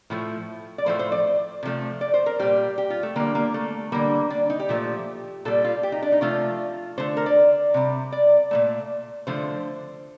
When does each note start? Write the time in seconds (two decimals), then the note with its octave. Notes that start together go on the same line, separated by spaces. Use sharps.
0.10 A2 F3 A3
0.78 D5
0.86 A2 F3 A3 C5
0.99 C5
1.12 D5
1.63 C3 F3 A3
2.01 D5
2.14 C5
2.26 A#4
2.40 A#2 G3 G4
2.78 G4
2.90 F4
3.03 A3
3.16 D3 G3 A#3
3.35 A#3
3.54 A3
3.92 D3 G3 A#3
4.30 D4
4.50 D#4
4.59 G4
4.69 A#2 F3 A3
5.45 A#2 G3 A4
5.65 F4
5.83 G4
5.92 D#4
6.03 D4
6.12 D#4
6.21 C3 F3 A3 F4
6.98 D3 A3 C5
7.17 A#4
7.26 D5
7.74 C3 G3
8.12 D5
8.51 A#2 F3 A3
9.27 D3 F3 A3 C5